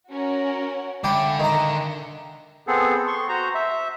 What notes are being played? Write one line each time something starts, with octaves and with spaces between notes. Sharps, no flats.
C#4 F#4 A#4
D3 D5 E5 F5 G5 G#5 B5
D#3 A#5
B3 C4 G#4 A4
C6 C#6
F#4 C5 A#5
E5